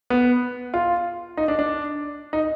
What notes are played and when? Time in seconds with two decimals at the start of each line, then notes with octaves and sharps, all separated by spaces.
0.10 B3
0.74 F4
1.37 D#4
1.48 D4
1.59 D4
2.33 D#4